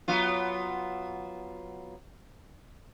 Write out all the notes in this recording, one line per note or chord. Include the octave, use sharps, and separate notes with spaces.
F#3 B3 F4